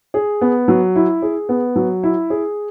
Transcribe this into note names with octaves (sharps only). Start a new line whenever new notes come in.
G#4
B3
F#3
E4
G#4
B3
F#3
E4
G#4